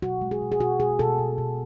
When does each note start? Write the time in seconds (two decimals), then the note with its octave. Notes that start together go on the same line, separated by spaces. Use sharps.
0.02 B2 F#4
0.21 G#3
0.31 G#4
0.42 B2
0.52 G#4
0.60 B2 F#4
0.80 B2 G#4
0.99 B2 A4
1.19 B2
1.38 B2